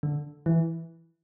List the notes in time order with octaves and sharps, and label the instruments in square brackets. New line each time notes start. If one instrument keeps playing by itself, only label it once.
[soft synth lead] D3
E3